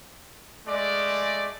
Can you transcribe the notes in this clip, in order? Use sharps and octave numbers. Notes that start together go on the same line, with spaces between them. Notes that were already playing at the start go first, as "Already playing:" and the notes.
G#3 A3 D5